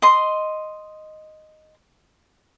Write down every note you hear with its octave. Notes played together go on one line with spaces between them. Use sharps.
D#5 C6